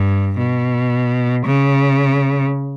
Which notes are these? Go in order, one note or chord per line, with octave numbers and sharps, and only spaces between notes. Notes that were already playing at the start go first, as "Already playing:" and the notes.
Already playing: G2
B2
C#3